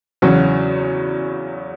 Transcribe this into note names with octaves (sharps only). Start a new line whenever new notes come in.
E2 C#3 F#3 C#4 F#4